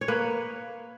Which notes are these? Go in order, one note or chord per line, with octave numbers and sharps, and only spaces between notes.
C#5
A#3 B4